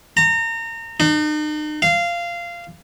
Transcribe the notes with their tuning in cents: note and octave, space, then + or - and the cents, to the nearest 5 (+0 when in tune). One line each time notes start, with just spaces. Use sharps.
A#5 -30
D#4 -40
F5 -15